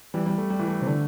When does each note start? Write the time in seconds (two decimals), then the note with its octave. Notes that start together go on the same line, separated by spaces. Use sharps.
0.14 E3 G3
0.26 G3
0.38 A3
0.50 G3
0.59 E3
0.68 A3
0.82 C3
0.87 D3 A3